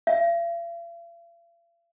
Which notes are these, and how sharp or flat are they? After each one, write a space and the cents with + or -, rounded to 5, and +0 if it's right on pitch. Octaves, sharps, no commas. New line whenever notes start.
F5 -45